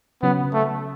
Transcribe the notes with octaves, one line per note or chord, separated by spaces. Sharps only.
C#3 F#3 B3 C#4
A3